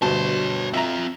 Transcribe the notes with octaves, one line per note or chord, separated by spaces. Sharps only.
D2 G2 B2 C#5 A5 C6
C4 F4 E5 A#5